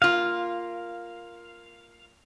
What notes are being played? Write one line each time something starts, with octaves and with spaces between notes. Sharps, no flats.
A#3 F4 F5